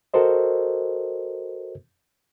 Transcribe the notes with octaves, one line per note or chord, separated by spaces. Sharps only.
F#4 A4 A#4 C5 D#5